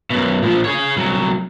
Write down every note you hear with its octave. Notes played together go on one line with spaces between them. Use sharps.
F#2 B2
A#2 F3
G#4 C#5
C2 F#3